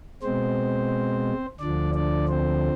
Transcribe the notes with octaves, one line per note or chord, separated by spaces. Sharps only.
B2 G#3 C4 C5
D2 D3 F3 D4 D5
D4 D5
C4 C5